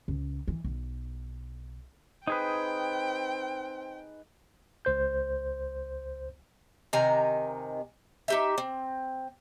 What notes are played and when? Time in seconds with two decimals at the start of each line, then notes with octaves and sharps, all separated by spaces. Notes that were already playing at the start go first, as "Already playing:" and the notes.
0.08 C#2
0.48 E3
0.64 B1
2.27 C4 D#4 G#4 B4 G5
4.85 C#2 C5 G6
6.93 C3 D#3 G#5 A#5
8.28 D#4 G4 E5
8.58 C4